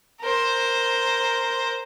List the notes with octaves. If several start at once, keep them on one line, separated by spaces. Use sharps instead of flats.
A#4 C5